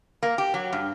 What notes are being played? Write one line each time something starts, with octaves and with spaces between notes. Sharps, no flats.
A#3
G4
F#3
G2